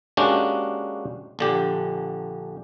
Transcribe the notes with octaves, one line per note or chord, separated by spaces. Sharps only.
G#3 A#3 C#4 D4 F#4 G4
A#1 D3 G4